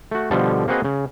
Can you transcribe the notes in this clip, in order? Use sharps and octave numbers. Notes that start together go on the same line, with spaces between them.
A3 F#4
B2 D3 F3 G3 A4
A#3 C4 F#4 G#4 B4 D#5
C#3